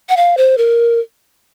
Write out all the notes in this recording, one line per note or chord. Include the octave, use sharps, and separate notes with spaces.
F#5
F5
C5
A#4